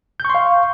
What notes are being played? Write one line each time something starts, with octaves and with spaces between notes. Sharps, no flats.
F5 C6 C#6 G6